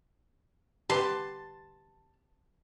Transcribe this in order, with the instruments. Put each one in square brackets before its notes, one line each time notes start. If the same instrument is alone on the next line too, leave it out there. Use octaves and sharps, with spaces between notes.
[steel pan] G4 B4 [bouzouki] A5 [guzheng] C6